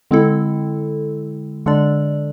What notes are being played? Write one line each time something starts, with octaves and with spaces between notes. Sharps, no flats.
D3 G#3 C4 E4 A4
D3 G#3 D4 A4 D5